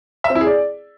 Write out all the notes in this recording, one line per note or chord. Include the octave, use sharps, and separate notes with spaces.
E5
C4
E4
G#4
D5